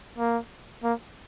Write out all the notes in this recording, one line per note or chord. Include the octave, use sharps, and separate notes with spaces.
A#3
A#3